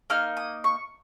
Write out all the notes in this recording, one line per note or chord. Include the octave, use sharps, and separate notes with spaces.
A#3 D#4 F6
D#6
C#6